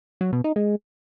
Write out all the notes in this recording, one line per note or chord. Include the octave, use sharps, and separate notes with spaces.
F#3
B2
D#4
G#3